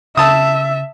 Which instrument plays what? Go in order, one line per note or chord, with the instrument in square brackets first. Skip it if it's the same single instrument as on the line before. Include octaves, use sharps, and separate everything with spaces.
[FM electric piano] C#3 E6 [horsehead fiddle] E5 [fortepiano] A5 D#6